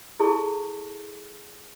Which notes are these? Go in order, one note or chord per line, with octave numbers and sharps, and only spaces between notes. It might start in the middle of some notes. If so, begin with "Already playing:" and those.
E4 G#4 A4 A5 C#6